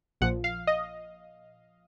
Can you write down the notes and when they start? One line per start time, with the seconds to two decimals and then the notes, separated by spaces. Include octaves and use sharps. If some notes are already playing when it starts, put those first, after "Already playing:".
0.21 A#1 A#2 F3 F#5
0.44 F5
0.67 D#5